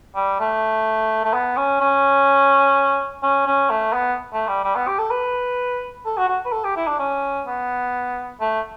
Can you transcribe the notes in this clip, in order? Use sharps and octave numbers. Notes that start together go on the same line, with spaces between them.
G3
A3
A3
B3
C#4
C#4
C#4
C#4
A3
B3
A3
G3
G3
B3
G4
A4
B4
A4
F#4
F#4
B4
A4
G4
E4
D4
C#4
B3
A3